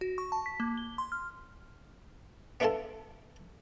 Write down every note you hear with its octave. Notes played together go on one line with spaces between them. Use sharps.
F#4
C#6
A5
B6
A#3
G7
C6
F6
B3 D4 E4 F4 A4 A5